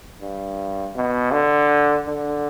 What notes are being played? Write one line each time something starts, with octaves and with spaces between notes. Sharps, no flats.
G2
B2
D3
D3